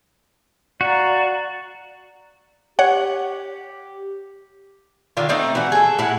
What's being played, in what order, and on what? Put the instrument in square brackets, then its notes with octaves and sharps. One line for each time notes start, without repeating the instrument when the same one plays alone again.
[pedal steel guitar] F#4 [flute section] D5 F5 A#5
[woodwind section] G4 [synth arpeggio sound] C#5 F#5
[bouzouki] D3 D#3 F4
A3 C4 D#4
E3 F#4
G#4 A4
A2 E4 F#5